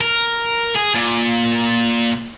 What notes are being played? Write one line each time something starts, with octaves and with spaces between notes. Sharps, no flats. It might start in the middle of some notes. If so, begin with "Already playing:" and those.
A#4
G#4
A#2